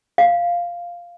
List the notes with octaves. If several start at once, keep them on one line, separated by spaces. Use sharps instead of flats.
F5